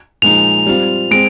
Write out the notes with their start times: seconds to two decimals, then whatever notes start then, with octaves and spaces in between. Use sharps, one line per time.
0.22 A#2 F3 G#3 D#4 F7
0.67 G3 C4 F4
1.11 G#3 C4 D7